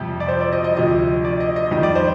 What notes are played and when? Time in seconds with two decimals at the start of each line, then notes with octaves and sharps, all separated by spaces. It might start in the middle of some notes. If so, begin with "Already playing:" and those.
Already playing: F2 C3 G3
0.20 D5
0.28 C5
0.41 D5
0.52 D#5
0.64 D#5
0.77 D2 C3 F3 D#5
1.25 D5
1.40 D#5
1.56 D#5
1.71 F2 D#3 G3 D#5
1.83 D5
1.95 C5